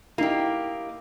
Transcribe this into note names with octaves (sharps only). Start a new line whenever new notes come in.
A#3 D#4 E4 G4